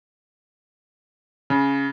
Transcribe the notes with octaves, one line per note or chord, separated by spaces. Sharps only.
C#3